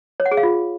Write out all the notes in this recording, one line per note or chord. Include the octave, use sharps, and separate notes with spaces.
C#5
F#5
G#4
F5
F4